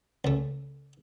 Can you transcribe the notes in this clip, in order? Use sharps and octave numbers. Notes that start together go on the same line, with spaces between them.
C#2 A3